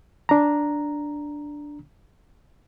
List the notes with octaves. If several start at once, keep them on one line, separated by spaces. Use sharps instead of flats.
D4 A#5